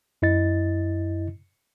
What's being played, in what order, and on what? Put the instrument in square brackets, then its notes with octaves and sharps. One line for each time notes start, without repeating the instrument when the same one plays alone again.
[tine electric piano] F#2 E4 D#5 A6